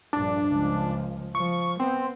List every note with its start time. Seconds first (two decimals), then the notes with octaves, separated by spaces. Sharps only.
0.13 A#1 G2 D4
0.47 C#2 F3
1.35 F3 C#6
1.80 B3 C4